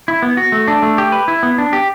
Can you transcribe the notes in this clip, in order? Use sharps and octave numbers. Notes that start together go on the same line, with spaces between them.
E4
B3
F#4
A3
D4
A3
G4
B4
E4
B3
D4
G4